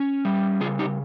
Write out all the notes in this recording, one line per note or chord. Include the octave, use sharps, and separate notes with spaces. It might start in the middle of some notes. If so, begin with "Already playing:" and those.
Already playing: C#4
G3
C#3 F4 G#4
D#4 G4